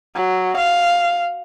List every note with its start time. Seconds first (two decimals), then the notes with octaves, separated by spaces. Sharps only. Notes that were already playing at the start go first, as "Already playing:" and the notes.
0.16 F#3
0.58 F5